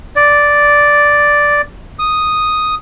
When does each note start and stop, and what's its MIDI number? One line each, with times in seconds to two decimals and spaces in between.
0.16 1.62 74
1.99 2.75 87